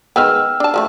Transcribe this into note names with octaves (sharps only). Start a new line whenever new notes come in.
D#3 G#3 B3 G5 E6 F6
D4 A5
F3 G#3 A3